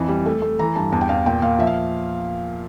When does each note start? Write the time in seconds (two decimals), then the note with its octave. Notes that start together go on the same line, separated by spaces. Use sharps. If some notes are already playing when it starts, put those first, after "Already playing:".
Already playing: F2 E3
0.08 G3
0.26 A3
0.42 A3
0.59 E3 A#5
0.76 G2 A5
0.92 E2 A5
1.01 G5
1.09 E2 F5
1.26 A#2 G5
1.42 A#2 F5
1.59 F3 E5
1.67 F5